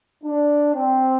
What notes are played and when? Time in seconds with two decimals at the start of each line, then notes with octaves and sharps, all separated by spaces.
0.24 D4
0.75 C4